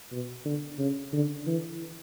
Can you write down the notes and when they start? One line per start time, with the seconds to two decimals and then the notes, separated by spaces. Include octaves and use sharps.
0.12 B2
0.45 D3
0.79 C#3
1.13 D3
1.46 E3